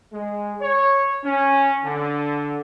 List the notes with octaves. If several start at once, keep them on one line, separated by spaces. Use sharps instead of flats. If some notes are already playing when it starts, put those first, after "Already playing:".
G#3
C#5
C#4
D3